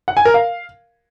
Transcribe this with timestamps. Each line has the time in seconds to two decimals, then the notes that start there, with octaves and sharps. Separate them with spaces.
0.08 F#5
0.17 G#5
0.25 A#4
0.34 F5